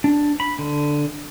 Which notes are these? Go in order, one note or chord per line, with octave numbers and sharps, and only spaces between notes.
D4
B5
D3